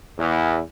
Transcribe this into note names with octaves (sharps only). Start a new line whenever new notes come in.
E2